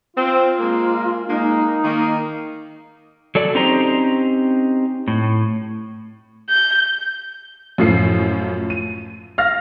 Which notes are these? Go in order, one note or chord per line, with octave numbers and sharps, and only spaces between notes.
C4 F4
G#3 A#3
G#3 A#3 D#4
D#3 A#3
F#3 A4 D5
C4 C#4 D#4 G4 C5 A#5
A2
G6
F#2 A2 F3 C7
D#7
F5 F6 A#6